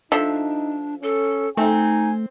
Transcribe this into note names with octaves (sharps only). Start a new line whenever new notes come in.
F3 D4 D#4 A4 E5
C#4 A4
A3 C4 D#4 G#5